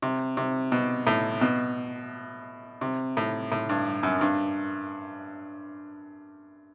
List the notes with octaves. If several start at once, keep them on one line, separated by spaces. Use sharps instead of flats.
C3
C3
B2
A2
B2
C3
A2
A2
G2
F#2
G2